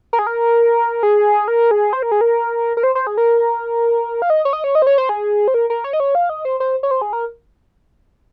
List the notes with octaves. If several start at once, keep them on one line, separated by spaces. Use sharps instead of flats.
A#4
G#4
A#4
G#4
A#4
G#4
C5
A#4
G#4
A#4
A#4
C5
C5
G#4
A#4
F5
D#5
C#5
D#5
C#5
D#5
C5
C#5
C5
G#4
C5
A#4
A#4
C#5
D#5
C#5
F5
D#5
C5
C5
C#5
C5
G#4
A#4